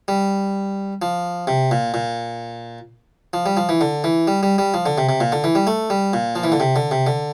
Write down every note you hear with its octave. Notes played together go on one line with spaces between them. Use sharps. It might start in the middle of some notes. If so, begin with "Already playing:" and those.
G3
F3
C3
A#2
A#2
F3
G3
F3
E3
D3
E3
G3
G3
G3
F3
D3
C3
C3
A#2
D3
E3
G3
A3
G3
A#2
F3
E3
D3
C3
D3
C3
D3